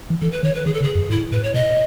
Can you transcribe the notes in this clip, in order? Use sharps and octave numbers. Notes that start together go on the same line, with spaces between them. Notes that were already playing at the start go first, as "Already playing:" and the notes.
E3
E3 A4
B4
D#3 C#5
B4
D#3 G#4
A4
C#3
G#4
F#2
G#2 E4
A2 B4
C#5
B2 D#5